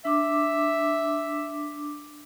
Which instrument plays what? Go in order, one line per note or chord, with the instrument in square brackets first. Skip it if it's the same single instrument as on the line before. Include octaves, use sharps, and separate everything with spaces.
[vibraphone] D4 D6 [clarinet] E5